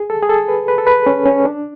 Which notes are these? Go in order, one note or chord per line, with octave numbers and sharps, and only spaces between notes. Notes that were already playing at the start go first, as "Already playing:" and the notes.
Already playing: G#4
A4
G#4
A4
B4
B4
A4
B4
C#4
C#4
D4